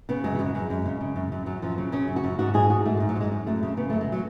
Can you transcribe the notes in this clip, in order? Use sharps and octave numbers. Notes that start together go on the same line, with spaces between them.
C#3 B3
F#2 G#3
F#3
F#2 G#3
F#2
F#2
C#3
C#3
F#2
F#2
F#2 F#3
F#2 F3
C#3 F#3
C#3 C#4
F#2
F#4
F#2
G#2 F#4
G#2 G#4
G#2 F#4
G#2 A3
G#3
G#2
F#3
G#2 G#3
F#2
F#2 A3
C#3
C#3 B3
F#2 A3
G#3
F#3